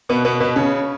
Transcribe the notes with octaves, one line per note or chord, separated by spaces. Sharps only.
B2 B3
B2 B3
B2 B3
C#3 C#4